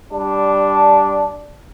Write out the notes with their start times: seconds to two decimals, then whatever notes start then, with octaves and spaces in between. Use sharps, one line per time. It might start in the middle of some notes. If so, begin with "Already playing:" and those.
0.13 G3 D4